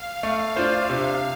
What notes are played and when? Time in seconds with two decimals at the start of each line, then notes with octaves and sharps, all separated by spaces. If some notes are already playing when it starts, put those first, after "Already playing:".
Already playing: F5
0.22 A3 F5
0.56 D4 F4 C5 F5
0.90 C3 F5